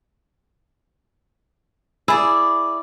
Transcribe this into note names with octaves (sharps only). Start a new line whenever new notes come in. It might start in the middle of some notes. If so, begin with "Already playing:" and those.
E4 G#4 D5